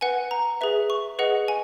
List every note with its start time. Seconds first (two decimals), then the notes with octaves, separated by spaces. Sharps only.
0.01 B4 F#5 G#5
0.31 A#5
0.61 G#4 B4 E5
0.90 C#6
1.19 G#4 B4 D#5 F#5
1.48 G#5